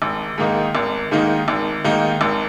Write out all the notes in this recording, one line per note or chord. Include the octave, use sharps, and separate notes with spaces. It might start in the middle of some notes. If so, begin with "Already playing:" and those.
G#1
G#2 D#3 A#3 D#4
G#1
G#2 D#3 A#3 D#4
G#1
G#2 D#3 A#3 D#4
G#1